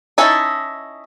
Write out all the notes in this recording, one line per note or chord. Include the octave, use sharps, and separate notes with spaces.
C#4 D#4 E4 A4